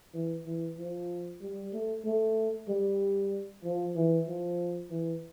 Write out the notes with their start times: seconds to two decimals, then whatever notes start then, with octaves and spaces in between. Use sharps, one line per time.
0.14 E3
0.46 E3
0.78 F3
1.42 G3
1.73 A3
2.05 A3
2.69 G3
3.64 F3
3.96 E3
4.28 F3
4.91 E3